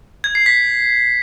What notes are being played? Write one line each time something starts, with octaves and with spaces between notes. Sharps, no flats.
G#6
C7
B6